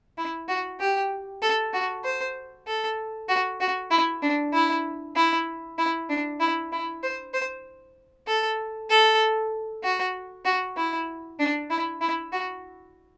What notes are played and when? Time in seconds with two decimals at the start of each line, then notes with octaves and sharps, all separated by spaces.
0.18 E4
0.48 F#4
0.80 G4
1.43 A4
1.73 F#4
2.05 C5
2.67 A4
3.29 F#4
3.60 F#4
3.91 E4
4.22 D4
4.53 E4
5.16 E4
5.78 E4
6.09 D4
6.40 E4
6.72 E4
7.03 C5
7.34 C5
8.27 A4
8.90 A4
9.84 F#4
10.45 F#4
10.77 E4
11.39 D4
11.71 E4
12.01 E4
12.32 F#4